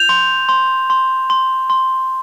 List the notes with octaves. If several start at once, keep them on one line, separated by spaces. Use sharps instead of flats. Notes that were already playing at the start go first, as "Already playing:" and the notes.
Already playing: G6 F7
C6
C6
C6
C6
C6